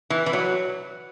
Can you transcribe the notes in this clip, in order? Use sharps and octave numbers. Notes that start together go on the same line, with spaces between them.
E3
E3
F#3